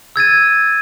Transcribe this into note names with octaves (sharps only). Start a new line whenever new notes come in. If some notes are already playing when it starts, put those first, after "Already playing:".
E6 G#6 A6 D#7